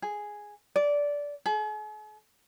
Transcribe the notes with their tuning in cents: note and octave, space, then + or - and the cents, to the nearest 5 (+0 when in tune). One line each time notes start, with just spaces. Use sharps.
G#4 +0
D5 -15
G#4 +45